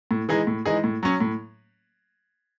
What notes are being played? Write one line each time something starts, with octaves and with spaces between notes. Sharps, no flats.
A2
E3 G#3 D#4 G#4
A2
E3 G#3 D#4 G#4
A2
F#3 C#4
A2